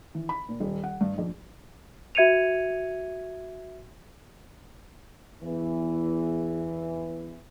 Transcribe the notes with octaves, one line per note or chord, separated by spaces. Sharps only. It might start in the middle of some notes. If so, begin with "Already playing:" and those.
E3
B5
A#2
D#1
F#5
G2
A#1
F#4 E5 G#6 C#7 D#7 F7
E2 E3